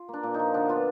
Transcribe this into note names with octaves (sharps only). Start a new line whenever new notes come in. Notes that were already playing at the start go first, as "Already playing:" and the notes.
Already playing: F4
A#3
D4
A#2
D#4
F3
D3 D4
B3 F4